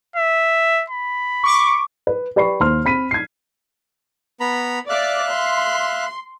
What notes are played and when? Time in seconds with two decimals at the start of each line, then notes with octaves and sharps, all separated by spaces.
0.16 E5
0.90 B5
1.44 C#6 D6
2.07 B4
2.36 G4 B4 D5 B5 C#6 C7
2.60 D#2 C5 C6 F6
2.85 C4 B5 B6 D#7
3.11 G#6 C7
4.40 B3 A#5 B5
4.90 D5 E5 F5 F#6
5.32 C6